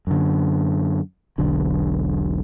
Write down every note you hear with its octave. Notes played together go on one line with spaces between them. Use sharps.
F#2 D3
E1 B1 D3